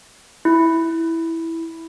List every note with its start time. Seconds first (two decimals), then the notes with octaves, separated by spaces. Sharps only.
0.45 E4